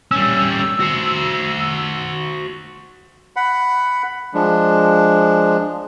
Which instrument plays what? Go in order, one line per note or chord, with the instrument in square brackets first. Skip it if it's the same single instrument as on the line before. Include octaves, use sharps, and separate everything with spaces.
[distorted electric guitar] G3 C#4 [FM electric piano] E6
[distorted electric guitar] F#4 C5
[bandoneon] F#5 B5
F3 G#3 D4